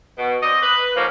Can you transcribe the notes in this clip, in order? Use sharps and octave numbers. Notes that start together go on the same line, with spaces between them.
B2
C4 D5 D#5
B4
G#2 F3 A#3 C#4 F4